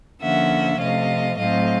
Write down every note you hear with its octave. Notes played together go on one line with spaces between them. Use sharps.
D3 F3 A#3 C#4 E5 F#5
C3 F3 A3 D#5 F5
A2 F#3 A3 C4 D#5 F5